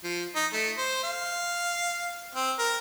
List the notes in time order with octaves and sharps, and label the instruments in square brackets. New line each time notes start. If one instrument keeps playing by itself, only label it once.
[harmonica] F3
D#4
A3
C5
F5
C4
A#4